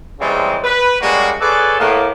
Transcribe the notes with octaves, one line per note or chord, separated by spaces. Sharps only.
C#3 E3 G3 G#3 A#3 C4
B4
G3 G#3 A#3 C#4 F#4
G#4 A4 B4 C#5 D5
A2 A#3 B3